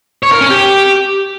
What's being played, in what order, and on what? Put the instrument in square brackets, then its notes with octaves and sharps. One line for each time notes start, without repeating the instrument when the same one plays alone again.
[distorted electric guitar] C#5
A#4
C#4
G4